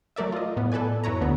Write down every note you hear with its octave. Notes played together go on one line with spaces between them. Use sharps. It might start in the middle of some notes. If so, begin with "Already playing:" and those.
F#3 A3 A#4 D5 E5
F4 D#5
A2 B3
A4 B4 D5 G#5
F#2 E4 B4 C#5 A#5
D2 D3 B3